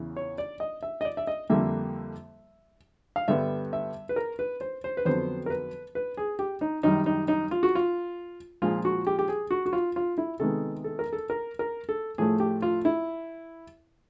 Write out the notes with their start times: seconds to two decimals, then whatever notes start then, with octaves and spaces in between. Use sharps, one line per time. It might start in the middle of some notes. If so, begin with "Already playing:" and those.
Already playing: E2 C#3 E3
0.17 C#5
0.38 D5
0.60 D#5
0.83 E5
1.01 D#5
1.05 D5
1.17 E5
1.27 D#5
1.50 F2 D3 G3 A#3 E5
3.16 F5
3.28 G2 D3 G3 B3 E5
3.73 E5
4.09 B4
4.16 A#4
4.39 B4
4.61 C5
4.84 C5
4.97 B4
5.05 F2 D3 F#3 B3 C5
5.46 A#4
5.50 B4
5.95 B4
6.17 G#4
6.39 G4
6.61 D#4
6.83 F#2 D#3 G3 D#4
7.06 D#4
7.28 D#4
7.51 F4
7.63 F#4
7.75 F4
8.62 A#2 F3 G#3 F4
8.85 F#4
9.07 G4
9.19 G4
9.28 G#4
9.51 F#4
9.66 F#4
9.73 F4
9.96 F4
10.18 E4
10.39 C3 D#3 G#3 B3 A4
10.84 A4
10.99 A#4
11.13 A4
11.30 A#4
11.59 A#4
11.89 A4
12.18 A2 F3 A3 G#4
12.40 G4
12.62 F4
12.85 E4